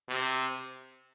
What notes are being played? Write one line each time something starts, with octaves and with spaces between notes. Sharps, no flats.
C3